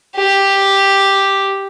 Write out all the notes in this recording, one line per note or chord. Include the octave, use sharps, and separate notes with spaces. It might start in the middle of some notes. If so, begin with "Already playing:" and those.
G4